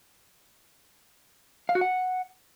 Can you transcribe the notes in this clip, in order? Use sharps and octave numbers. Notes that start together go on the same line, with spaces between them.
F5
F#4
F#5